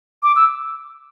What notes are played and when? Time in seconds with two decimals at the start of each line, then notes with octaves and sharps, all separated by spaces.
0.23 D6
0.36 E6